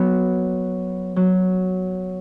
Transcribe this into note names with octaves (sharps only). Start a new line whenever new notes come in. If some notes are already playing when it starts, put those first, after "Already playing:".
Already playing: F#3 B3
F#3